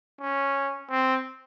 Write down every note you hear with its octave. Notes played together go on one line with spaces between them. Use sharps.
C#4
C4